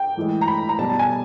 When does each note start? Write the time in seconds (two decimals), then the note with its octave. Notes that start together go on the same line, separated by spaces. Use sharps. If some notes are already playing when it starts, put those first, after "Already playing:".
Already playing: G5
0.17 A2 E3 G#3
0.41 A#5
0.48 B5
0.69 A#5
0.79 B2 G3 A5
0.90 A5
0.99 G#5